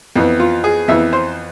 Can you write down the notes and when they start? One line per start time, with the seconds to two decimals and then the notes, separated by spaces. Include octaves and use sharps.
0.16 F2 E3 B3
0.40 F4
0.64 G#4
0.88 F2 E3 B3 E5
1.13 C5